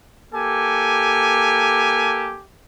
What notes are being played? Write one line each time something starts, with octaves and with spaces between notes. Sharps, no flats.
A#3 G4 A4 G#5